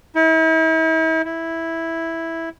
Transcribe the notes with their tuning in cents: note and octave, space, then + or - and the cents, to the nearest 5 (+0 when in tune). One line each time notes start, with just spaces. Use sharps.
E4 -40
E4 -5